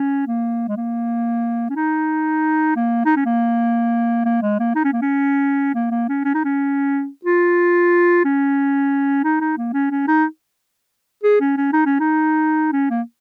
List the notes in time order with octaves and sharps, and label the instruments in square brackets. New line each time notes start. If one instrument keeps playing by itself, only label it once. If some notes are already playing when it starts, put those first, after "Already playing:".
Already playing: [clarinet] C#4
A#3
G#3
A#3
C#4
D#4
A#3
D#4
C#4
A#3
A#3
G#3
A#3
D#4
C#4
A#3
C#4
A#3
A#3
C#4
C#4
D#4
C#4
F4
C#4
D#4
D#4
A#3
C#4
C#4
D#4
G#4
C#4
C#4
D#4
C#4
D#4
C#4
A#3